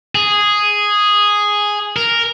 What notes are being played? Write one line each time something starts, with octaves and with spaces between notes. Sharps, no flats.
G#4
A#4